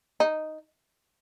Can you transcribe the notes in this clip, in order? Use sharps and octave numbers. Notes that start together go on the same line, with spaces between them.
D#4